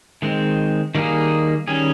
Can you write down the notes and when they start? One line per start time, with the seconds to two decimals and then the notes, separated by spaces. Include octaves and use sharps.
0.22 D#3 G#3 C4
0.95 D#3 G3 A#3 D#4 G#4
1.68 D#3 G3 C#4 G#4